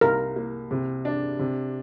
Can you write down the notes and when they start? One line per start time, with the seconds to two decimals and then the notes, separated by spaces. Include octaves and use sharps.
0.01 C2 A#4
0.36 A#3
0.71 C3
1.05 D4
1.39 C3